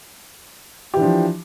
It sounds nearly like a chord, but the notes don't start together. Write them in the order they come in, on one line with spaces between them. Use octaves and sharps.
G4 E3 D4 F3